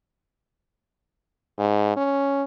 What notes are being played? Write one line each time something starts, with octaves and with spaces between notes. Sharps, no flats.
G#2
C#4